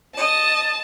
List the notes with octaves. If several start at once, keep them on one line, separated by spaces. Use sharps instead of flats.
D#5 A5